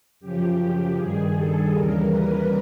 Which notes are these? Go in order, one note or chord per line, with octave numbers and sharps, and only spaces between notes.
F#2 C#3 F3 G4
G2 D#3 G3 G#4
A4
D#2 C#3 E3 G3 A#4
B4